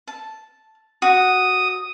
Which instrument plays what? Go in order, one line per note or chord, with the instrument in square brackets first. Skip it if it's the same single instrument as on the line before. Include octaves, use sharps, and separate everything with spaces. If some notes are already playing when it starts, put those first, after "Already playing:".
[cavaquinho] A5
[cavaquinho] F#4 [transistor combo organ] D#6